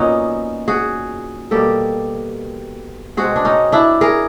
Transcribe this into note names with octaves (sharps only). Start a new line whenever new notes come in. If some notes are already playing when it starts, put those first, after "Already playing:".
Already playing: A#2 F#3 B3 C#4 D#4
F#4 G#4
B2 G3 A#3 G4 A4
B2 G#3 C4 F#4 G#4
D4
C#4 D#4
D4 E4
G#4 A#4